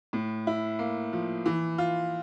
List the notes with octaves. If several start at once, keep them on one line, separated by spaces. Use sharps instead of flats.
A2
E4
A#3
F3
E3
F4